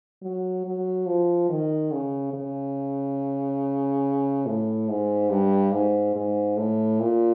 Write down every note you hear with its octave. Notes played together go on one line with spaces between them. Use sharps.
F#3
F#3
F3
D#3
C#3
C#3
A2
G#2
G2
G#2
G#2
A2
A#2